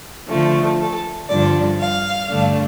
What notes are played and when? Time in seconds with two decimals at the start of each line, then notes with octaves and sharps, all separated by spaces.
0.29 D3 F3 A3
0.80 A4
1.28 G2 D3 F3 D4 D5
1.80 F5
2.28 G2 D3 A3 D4